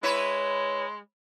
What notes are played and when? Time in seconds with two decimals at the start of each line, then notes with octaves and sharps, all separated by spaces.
0.03 G#3 E4 B4 C#5